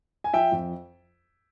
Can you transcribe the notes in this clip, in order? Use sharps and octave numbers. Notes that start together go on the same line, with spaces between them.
G#5
F3 E5 G5
F2